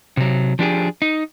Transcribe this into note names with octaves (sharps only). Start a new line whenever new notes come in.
C3 F#3
F3 D4 G4 G#4
D#4